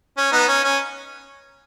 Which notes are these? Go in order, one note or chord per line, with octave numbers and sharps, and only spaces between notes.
C#4
B3 D#4
C#4
C#4